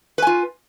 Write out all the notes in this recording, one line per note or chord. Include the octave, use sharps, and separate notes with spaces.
F4 B4 G#5